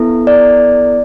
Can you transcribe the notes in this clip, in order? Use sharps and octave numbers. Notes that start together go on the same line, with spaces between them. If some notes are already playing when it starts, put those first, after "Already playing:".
Already playing: B3 E4 A4
D5